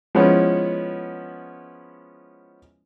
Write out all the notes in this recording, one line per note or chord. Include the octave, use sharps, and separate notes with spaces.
F3 G#3 B3 C#4 E4